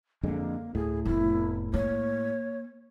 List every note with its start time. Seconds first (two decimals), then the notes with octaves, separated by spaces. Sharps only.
0.23 F2 D3 G#3 A#3
0.75 D2 A2 G#4
1.05 F1 B3 E4
1.74 A#3 C#5